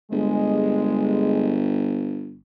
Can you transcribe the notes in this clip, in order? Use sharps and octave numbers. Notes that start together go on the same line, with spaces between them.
G1 G#3